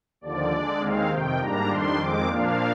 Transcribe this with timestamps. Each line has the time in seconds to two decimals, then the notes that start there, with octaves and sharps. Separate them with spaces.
0.21 D#2 D3 F3 D5
0.51 D3 G#3 D4
0.80 D#2 D#3 G#3 C4 F5
1.10 F2 C3 D#3 G5
1.39 G#2 G3 A#3 D4 A#5
1.68 F2 D#3 G3 D4 C6
1.97 F2 D#3 G#3 C4 D6
2.27 A#2 F3 A#3 D4 F5